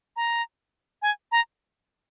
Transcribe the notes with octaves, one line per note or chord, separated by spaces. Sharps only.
A#5
G#5
A#5